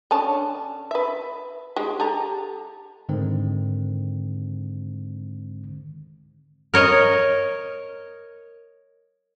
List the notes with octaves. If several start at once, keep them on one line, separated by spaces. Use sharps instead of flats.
D3 C#4 A5
B4 E5
G#3 G4
G4 A4 A#5
G#2 D3 D#3 G#3 C4
A#4 C#5 D#5